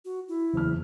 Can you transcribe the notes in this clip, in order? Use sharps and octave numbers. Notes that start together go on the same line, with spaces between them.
F#4
E4
F#1 E2 F6